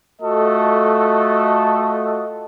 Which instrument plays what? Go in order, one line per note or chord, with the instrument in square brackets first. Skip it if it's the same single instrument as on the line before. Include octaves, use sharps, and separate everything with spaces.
[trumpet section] A3 F4 F#4 A4 D#5